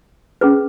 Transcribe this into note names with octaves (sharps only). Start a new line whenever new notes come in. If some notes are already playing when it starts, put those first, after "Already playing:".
C#4 G#4 B4